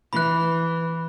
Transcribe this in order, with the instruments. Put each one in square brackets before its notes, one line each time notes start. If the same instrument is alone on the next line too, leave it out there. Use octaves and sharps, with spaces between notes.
[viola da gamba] E3 [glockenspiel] B5 F#6